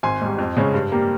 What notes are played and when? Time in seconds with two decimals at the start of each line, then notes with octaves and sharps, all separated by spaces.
0.03 G#1 G#5 C6
0.21 G#2 G3
0.38 F2
0.57 C#3 G#3 C#4
0.74 G2
0.92 G3 A#3